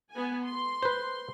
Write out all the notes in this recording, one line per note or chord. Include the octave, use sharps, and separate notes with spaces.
B3 G#5
C6
B4 C5